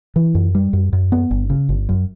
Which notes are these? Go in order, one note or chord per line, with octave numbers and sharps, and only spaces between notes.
E3
F#2
G3
F#2
F#2
B3
G1
C#3
G1
F#2